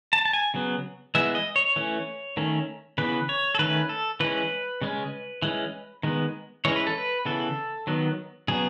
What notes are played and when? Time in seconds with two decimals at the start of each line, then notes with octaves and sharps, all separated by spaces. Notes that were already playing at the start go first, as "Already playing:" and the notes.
0.13 A5
0.25 A5
0.33 G#5
0.54 C#3 F#3 B3
1.15 E3 G#3 B3 E5
1.35 D#5
1.56 C#5
1.76 E3 A3 C#4
2.37 D#3 A3 C#4
2.98 C#3 E3 B3 B4
3.29 C#5
3.55 A4
3.59 D#3 A3 C#4 B4
3.89 A4
4.20 E3 G#3 C#4 B4
4.82 C#3 G#3 C#4
5.42 E3 G#3 C#4
6.03 D#3 G#3 B3
6.65 E3 G#3 C#4 C#5
6.76 B4
6.87 A4
6.98 B4
7.25 C#3 E3 B3 A4
7.87 D#3 F#3 B3
8.48 C#3 F#3 B3 G#4